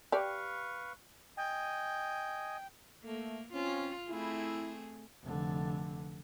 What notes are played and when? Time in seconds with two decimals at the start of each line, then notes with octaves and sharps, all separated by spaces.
0.12 G4 B4 D5 F5 C#6
1.37 D#5 G5 G#5
3.04 A3 A#3
3.53 C4 C#4 F4
4.09 A3 C4 E4 G#4
5.23 F1 D3